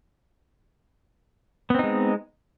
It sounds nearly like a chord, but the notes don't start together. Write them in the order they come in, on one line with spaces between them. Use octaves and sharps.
B3 C4 D#4 G#3